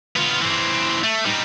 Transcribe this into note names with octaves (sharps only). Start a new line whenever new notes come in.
B3 F4
E3 C4
A3
G3 D#4